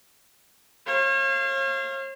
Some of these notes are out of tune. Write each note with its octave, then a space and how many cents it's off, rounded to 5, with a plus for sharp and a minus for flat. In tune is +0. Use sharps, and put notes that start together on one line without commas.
C#5 -45 F5 -20